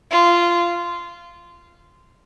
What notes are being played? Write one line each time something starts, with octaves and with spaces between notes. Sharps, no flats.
F4